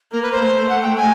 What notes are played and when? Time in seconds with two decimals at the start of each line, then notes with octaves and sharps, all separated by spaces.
0.12 A#3 A#4
0.22 B4
0.32 C5
0.41 A3
0.69 F#5
0.83 G5
0.97 G#5